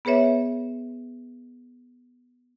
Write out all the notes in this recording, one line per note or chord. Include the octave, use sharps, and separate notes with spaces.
B3 G#4 B4 C#5 E5